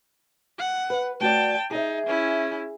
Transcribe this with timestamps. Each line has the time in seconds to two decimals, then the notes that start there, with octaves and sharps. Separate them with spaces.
0.59 F#5
0.90 B4
1.21 A3 F#4 D5 G5 A5
1.71 D#4 G#4 E5
2.07 C#4 E4